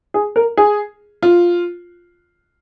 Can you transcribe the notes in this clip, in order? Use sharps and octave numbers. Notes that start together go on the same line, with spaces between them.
G#4
A#4
G#4
F4